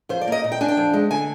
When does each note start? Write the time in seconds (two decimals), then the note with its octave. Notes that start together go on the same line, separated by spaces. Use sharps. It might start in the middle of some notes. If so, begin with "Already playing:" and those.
0.09 F2 C5
0.21 D5
0.28 A#3 D#5
0.44 A#2
0.52 G5
0.61 D4 G#5
0.68 G5
0.77 F2
0.94 G#3
1.11 D3 G#5